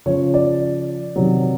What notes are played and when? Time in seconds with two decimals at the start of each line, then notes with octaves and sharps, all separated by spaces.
0.06 C#3 F3 C#5
0.34 D5
1.16 C3 D#3 F#3